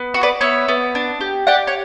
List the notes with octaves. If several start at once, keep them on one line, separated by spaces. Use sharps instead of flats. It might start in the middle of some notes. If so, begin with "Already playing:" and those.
Already playing: B3
F#4
B4 D5
B3 C#5 E5
B3
D4
G4
G4 D5 F#5
C#5